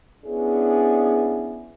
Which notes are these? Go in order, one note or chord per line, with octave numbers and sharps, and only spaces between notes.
B3 C#4 D4 E4 G#4